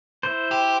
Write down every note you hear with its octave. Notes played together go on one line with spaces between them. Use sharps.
E4 C5
G4